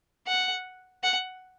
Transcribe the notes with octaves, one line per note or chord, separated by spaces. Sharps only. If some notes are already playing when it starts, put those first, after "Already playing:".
F#5
F#5